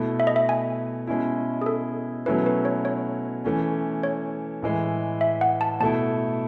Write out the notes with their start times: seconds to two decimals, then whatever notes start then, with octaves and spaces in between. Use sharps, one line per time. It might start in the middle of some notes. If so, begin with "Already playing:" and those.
Already playing: B2 A3 E4
0.20 E5
0.27 D#5
0.36 E5
0.49 G#5
1.07 B2 G#3 C#4 E4
1.62 G#4
1.66 A4
2.26 B2 F#3 A3 C#4 E4 B4
2.46 B4
2.65 C#5
2.85 C#5
3.44 E3 A3 C#4
4.03 C#5
4.62 A2 E3 G#3
5.21 E5
5.41 F#5
5.61 A5
5.80 B2 A3 E4 A5